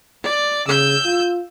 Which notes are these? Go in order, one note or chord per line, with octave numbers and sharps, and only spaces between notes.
D5
C#3 E6 G6
F4